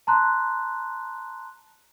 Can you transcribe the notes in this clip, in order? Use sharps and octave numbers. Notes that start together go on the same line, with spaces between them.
A5 A#5 C6 F#6